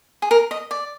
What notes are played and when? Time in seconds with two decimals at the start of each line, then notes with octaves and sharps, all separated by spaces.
0.22 G#4
0.31 A#4
0.51 D#5
0.71 D5